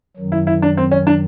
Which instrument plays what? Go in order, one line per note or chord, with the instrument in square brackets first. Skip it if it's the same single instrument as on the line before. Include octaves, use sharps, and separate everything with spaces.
[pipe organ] F#2 D#3 F#3
[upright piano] E4
E4
D4
C4
C#4
D4